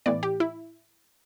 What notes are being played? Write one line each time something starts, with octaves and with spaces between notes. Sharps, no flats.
A2 E3 B3 D5
G4
E4